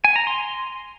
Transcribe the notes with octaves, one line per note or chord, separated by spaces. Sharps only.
G#5
A#5
C6